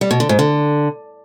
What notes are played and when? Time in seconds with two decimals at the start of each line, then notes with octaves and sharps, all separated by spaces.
0.01 G3
0.11 B2
0.20 D3
0.29 G#2
0.39 D3